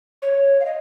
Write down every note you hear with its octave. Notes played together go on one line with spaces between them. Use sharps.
C#5
F5
D#5